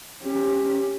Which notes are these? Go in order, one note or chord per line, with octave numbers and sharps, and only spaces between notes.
C#4 G4